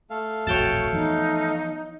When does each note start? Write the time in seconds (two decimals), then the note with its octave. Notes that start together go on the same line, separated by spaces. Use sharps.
0.10 A3 A4 F5
0.47 D#1 A1 F2 F#4 C#5 G5 A5
0.93 E3 F3 B3 D#4